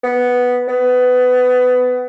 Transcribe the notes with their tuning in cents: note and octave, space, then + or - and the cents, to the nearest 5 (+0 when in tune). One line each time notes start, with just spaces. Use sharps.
B3 +0
B3 +20